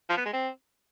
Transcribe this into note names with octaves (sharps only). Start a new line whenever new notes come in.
F3
B3
G#3
C4